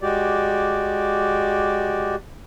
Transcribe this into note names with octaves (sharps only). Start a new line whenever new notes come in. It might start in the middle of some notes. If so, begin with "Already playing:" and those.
G#3 F#4 G4 D5